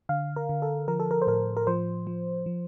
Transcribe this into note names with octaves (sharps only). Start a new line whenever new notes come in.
D3 F5
A#4
D3
A4
F3 A#4
A4
A#4
C5
A2 A#4
A#4
F3 C5
F3
F3